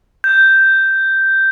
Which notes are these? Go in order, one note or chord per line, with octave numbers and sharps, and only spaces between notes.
G6